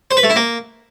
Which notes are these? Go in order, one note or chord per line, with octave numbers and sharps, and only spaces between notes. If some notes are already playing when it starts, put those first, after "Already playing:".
C5
B4
A3
E4
A#3